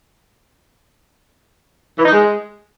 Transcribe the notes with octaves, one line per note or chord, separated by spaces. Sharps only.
E3
D#4
G#3